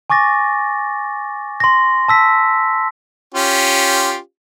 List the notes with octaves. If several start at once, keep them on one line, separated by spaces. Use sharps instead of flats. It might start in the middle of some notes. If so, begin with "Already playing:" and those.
G#5 C#6 D6 A6 A#6
C6 A#6
A5 E6 B6
C#4 F4 G4